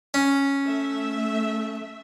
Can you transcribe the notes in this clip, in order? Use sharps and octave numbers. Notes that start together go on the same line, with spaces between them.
C#4
A3 E5